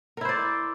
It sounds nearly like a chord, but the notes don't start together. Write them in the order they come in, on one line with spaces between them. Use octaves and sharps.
A#4 E4 C5 D5